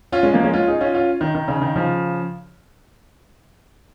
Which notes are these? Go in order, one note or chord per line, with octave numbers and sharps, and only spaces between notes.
C#4 F4
G#3 C#4
F3 A#3
G#3 C#4
C#4 F4
D#4 G#4
C#4 F4
C#4 F4
D#3
D#3
C#3
D#3
C#3 F3